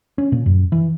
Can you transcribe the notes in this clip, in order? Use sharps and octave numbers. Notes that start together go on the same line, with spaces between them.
C#4
A#2
F#2
E3